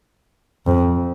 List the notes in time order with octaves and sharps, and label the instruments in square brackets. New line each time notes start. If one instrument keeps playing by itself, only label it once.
[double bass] F2